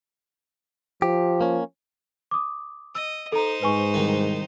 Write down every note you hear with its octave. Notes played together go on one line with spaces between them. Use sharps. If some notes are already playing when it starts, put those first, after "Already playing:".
F3 G4
A#3 C#4
D6 D#6
D#5 E6
D#4 A4 C5 A#5
G#2 B4 G#5 C#6
C2 D#3